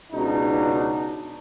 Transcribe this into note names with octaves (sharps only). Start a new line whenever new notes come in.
C#2 B2 D4 D#4